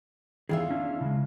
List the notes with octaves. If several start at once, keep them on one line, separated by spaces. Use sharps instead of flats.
E2 D#3 E3 F4 G#4 E5
C#4 D4 E4
C#3 G#3